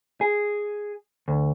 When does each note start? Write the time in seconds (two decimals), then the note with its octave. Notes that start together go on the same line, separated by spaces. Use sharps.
0.21 G#4
1.28 D2